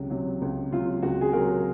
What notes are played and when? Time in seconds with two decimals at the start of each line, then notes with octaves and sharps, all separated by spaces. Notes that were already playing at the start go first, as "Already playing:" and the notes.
Already playing: C#2 C3 F#3
0.10 C3 F#3
0.42 C#2
0.72 C3 F#3 F4
1.03 C#2 F#4
1.21 G#4
1.33 C3 F#3 F#4 A#4